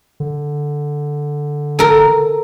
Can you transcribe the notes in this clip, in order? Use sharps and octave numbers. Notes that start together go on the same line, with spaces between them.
D3
A4 A#4